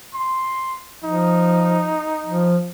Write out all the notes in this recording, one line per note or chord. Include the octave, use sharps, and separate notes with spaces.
C6
F3 D#4
F3